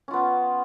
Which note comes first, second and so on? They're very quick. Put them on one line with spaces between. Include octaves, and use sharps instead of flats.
C#4 F4 B3